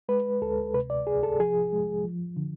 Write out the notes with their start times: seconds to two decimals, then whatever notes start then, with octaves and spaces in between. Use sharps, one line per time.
0.09 G#3 B4
0.42 D2 A4
0.74 C3 B4
0.90 D5
1.07 C2 G#4
1.23 A4
1.40 F3 G#4
1.72 G#3
2.04 F3
2.36 D3